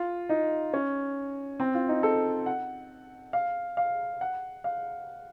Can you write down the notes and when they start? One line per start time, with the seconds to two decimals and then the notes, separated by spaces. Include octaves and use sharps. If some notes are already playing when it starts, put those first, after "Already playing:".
Already playing: F4
0.29 D#4
0.73 C#4
1.60 C4
1.74 F4
1.89 D#4
2.03 A4
2.46 F#5
3.33 F5
3.77 F5
4.21 F#5
4.64 F5